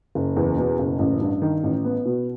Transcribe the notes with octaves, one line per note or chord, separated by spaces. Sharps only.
F#1
E2
B2
F#1
A1
G2
D#3
A1
B3
B2